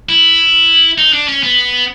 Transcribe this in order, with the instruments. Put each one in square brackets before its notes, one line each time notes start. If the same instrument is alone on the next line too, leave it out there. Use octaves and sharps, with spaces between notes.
[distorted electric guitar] E4
D#4
D4
C#4
B3